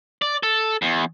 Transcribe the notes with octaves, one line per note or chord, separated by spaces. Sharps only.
D5
A4
E2